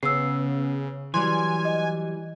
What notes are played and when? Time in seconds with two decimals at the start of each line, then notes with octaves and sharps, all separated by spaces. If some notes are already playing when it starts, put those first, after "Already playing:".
0.03 C#3 B3 E6 C7
1.14 E3 F#3 G3 G#5 C6
1.65 D#5